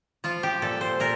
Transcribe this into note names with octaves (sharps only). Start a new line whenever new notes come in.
F3 F4
G4
A#2 A4
C5
A#2 A#4